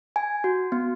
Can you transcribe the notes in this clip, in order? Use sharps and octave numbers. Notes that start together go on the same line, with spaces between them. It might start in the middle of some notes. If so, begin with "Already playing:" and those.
G#5
F#4
B3